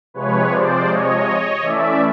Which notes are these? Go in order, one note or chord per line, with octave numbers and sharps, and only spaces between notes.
C3 F3 G#3 B4 C#5
C5 D5
C#5 D#5
E3 A3 C#4 D5 E5